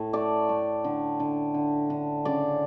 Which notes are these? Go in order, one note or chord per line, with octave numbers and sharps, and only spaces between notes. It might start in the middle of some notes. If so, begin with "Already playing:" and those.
Already playing: A2
A3 D5
A3
D3
D3
D3
D3
C#3 D5